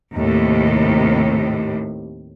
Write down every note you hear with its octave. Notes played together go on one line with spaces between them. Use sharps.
D#2 A2 C3